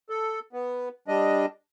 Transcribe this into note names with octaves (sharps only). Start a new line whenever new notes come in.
A4
B3
G3 D4 D#5